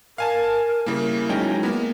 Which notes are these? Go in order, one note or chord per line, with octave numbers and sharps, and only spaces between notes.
A#4 F5 G#5 A5
C#3 G3 A#3 E4
F#3 G#3 C#4 D#4 G5
A#3 B3